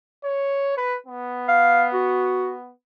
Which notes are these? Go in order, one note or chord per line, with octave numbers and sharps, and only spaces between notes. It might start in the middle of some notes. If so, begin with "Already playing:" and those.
C#5
B4
B3
F5
F#4